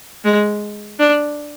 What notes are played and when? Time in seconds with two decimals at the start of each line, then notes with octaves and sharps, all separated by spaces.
0.25 G#3
0.99 D4